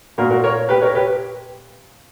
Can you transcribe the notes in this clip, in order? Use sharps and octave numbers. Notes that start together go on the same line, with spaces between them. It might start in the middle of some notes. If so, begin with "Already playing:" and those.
A#2 A#3 F#4 A#4
F#4 A#4
A#4 C#5
G4 B4
A#4 C#5
G4 B4